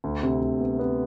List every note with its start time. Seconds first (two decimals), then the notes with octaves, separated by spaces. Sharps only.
0.04 D2
0.23 C3
0.41 D2
0.61 B3
0.79 B3